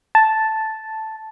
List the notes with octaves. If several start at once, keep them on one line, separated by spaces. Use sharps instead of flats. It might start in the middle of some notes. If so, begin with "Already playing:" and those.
A5